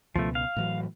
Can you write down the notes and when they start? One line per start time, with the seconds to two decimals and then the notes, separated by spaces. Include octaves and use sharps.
0.16 C#2 B2 F3 A3
0.35 F5
0.56 A2 E3 F#3